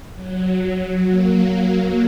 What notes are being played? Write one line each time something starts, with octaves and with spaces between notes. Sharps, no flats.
F#3
A#3